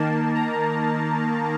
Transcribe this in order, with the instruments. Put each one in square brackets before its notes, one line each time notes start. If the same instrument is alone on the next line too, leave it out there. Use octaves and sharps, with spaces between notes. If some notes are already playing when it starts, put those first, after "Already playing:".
Already playing: [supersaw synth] D#3 A#3 A5
A#5